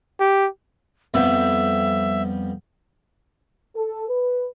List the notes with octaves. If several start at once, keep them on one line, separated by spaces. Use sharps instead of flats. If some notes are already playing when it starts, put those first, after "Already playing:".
G4
F2 G3 B3 E5
A4
B4